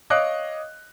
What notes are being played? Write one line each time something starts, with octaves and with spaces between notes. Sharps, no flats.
C#5 D#5 F5 D6 F#6